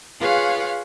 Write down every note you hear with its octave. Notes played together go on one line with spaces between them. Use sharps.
F4 G#4 B4 C#5 F5 F#5